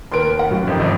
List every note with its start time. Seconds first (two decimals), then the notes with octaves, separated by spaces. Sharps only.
0.12 D#2 A#4 B4 C6 D7
0.39 A#4 F#5
0.51 F#2
0.67 F2 C3 D#3
0.79 G#1 F2 D#4